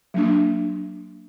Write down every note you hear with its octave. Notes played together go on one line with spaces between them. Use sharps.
F#3 A#3 D4